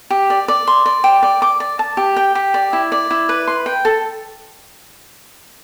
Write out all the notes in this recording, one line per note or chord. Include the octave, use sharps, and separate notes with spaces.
G4
D5
D5
C6
D5
G5
D5
D6
D5
A5
G4
G5
G4
D5
E4
D5
E4
B4
C6
G5
A4